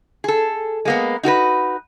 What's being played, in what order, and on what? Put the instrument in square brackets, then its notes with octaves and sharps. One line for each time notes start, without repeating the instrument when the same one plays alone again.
[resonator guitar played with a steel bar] G#4 A4
G#3 A#3 B3
D#4 F#4 A#4 B4